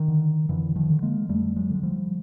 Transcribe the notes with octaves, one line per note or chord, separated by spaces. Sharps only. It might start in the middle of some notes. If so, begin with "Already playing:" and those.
Already playing: D#3
D3
F2 D3 E3
D#3 F3
D3
G#3 A#3
F2 G3 A3
F#3 G#3
D3
G#3
F3 G3